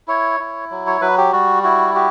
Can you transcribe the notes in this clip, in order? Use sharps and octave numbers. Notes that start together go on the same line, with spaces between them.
E4 C#5
E4
F#3
C#5
F#3 B4
G4
G3 F#4
E4 F#4
F#4 G4